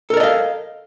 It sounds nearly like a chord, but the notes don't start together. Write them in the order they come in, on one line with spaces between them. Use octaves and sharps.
A4 A#4 D5 D#5 F5